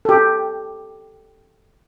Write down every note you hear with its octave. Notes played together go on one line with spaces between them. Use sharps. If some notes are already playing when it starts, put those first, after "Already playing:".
G4 A4